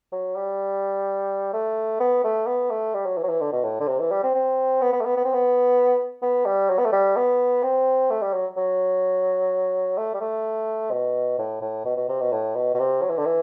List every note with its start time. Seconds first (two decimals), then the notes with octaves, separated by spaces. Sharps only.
0.12 F#3
0.36 G3
1.53 A3
2.00 B3
2.24 A3
2.47 B3
2.71 A3
2.94 G3
3.06 F#3
3.18 E3
3.23 F#3
3.29 E3
3.41 D3
3.52 B2
3.64 A2
3.80 D3
3.87 C3
4.00 E3
4.11 G3
4.23 C4
4.35 C4
4.82 B3
4.93 B3
5.01 A3
5.06 B3
5.17 B3
5.25 C4
5.34 B3
6.22 B3
6.46 G3
6.70 F#3
6.79 B3
6.85 A3
6.92 G3
7.16 B3
7.63 C4
8.10 A3
8.22 G3
8.34 F#3
8.57 F#3
9.98 A3
10.14 G3
10.21 A3
10.91 B2
11.38 A2
11.62 A2
11.85 B2
11.97 B2
12.09 C3
12.20 B2
12.32 A2
12.55 B2
12.74 B2
12.79 C3
13.02 F#3
13.10 E3
13.18 D3
13.26 E3